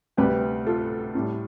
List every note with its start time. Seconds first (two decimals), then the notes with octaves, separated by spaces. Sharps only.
0.17 D2 C3 G3 G4 B4
0.67 F4 A4
1.15 A2 G3